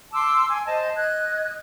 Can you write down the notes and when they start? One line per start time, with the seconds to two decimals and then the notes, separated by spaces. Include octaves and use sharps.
0.14 A5 C6 D6 E6
0.49 G#5
0.67 C5 D#5 A5
0.97 D#5 F#6 G#6